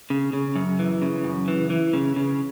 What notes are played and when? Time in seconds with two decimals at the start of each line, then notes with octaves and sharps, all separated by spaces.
0.10 C#3
0.33 C#3
0.56 F#2
0.79 E3
1.02 C#3
1.24 F#2
1.48 E3
1.70 E3
1.93 C#3
2.16 C#3